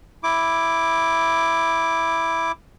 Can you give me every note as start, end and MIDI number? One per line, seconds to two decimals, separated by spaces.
0.23 2.52 64
0.23 2.52 86